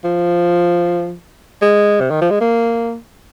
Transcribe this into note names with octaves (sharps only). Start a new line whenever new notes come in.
F3
G#3
C3
D#3
F3
G#3
A#3